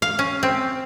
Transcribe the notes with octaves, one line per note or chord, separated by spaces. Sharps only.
F5
C#4
C4